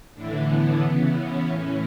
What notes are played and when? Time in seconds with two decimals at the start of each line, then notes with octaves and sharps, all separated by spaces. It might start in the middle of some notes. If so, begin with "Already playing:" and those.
0.15 A2 D3 E3 D4
0.49 B3
0.81 E3 B3
0.86 C#3
1.14 C#4
1.47 A2 E3 C#4